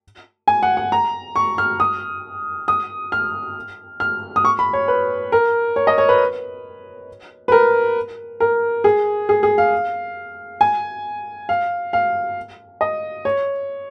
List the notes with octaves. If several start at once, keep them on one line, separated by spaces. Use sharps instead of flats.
G#5
F#5
F#5
A#5
C#6
F6
D#6
D#6
F6
F6
D#6
C#6
B5
C#5
B4
A#4
C#5
D#5
C#5
B4
B4
A#4
A#4
G#4
G#4
G#4
F5
G#5
F5
F5
D#5
C#5